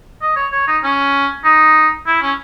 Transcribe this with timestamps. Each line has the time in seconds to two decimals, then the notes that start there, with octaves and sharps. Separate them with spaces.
0.22 D#5
0.36 C#5
0.52 C#5
0.68 D#4
0.84 C#4
1.44 D#4
2.07 E4
2.22 C#4